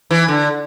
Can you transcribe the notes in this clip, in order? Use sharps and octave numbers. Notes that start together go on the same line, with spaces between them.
E3
D3